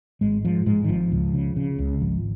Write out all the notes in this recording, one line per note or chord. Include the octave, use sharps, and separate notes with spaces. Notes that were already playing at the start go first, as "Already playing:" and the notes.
G#1 G#3
G#2 F3
G#2 G#3
D#3
G#1 F3
C#2
C#3
C#3
C#2
G#1 F3